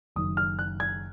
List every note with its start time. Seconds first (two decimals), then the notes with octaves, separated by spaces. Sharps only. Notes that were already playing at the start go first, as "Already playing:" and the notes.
0.16 F#1 F#2 D#3 D#6
0.37 F6
0.59 F#6
0.80 G#6